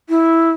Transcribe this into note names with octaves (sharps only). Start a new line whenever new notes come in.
E4